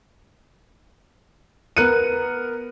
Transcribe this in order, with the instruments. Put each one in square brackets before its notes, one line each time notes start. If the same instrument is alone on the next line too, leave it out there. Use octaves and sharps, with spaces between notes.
[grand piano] B3 A#4 F#6 C#7 D#7